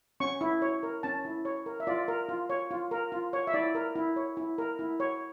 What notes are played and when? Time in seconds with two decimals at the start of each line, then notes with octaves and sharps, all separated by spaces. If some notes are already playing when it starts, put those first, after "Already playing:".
0.20 C#4 C#6
0.41 E4
0.62 C#5
0.83 A#4
1.03 C#4 A5
1.25 E4
1.45 C#5
1.66 A#4
1.80 E5
1.87 F4 D5
2.08 A#4
2.29 F4
2.50 C#5
2.71 F4
2.91 A#4
3.12 F4
3.33 C#5
3.47 E5
3.53 E4 D5
3.75 A#4
3.96 E4
4.16 C#5
4.37 E4
4.58 A#4
4.79 E4
5.00 C#5